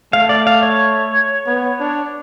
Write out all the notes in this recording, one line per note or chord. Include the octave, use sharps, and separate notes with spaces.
A3 F5
D5
F5
C#5
B3
D4